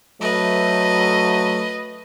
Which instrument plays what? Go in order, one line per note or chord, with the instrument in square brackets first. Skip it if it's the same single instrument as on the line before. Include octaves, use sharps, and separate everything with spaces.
[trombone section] F#3 A3 [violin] B4 D#5